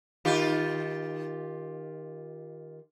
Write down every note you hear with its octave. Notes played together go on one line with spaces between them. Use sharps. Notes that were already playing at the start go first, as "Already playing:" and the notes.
D#3 F4 G4